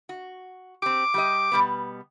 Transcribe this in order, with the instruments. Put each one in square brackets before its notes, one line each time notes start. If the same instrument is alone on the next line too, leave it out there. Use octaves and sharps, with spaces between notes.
[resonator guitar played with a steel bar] F#4
[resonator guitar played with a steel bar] C4 G4 [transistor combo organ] D6
[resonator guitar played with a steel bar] G3 G4 D#5
B2 G3 B3